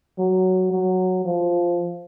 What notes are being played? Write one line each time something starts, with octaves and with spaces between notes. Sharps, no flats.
F#3
F#3
F3